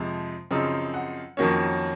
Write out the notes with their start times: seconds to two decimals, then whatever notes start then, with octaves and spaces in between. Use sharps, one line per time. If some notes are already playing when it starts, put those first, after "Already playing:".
Already playing: F2 C3 F3 G#3
0.51 F#2 C#3 F3 C4 D#4
0.94 F#5
1.37 F2 D#3 F#3 A#3 C#4